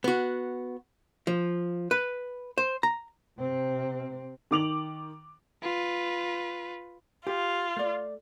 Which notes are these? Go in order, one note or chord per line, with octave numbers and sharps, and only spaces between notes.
B3 F#4
F3
B4
C5
A#5
C3 C4
D#3 D6 F7 F#7
F4 B4
F4 G4
A3 D5